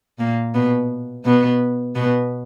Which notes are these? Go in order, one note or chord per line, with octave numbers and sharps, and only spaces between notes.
A#2 A#3
B2 B3
B2 B3
B2 B3